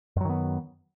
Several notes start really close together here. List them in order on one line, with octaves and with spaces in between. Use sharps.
F#2 F#3 D#3 B3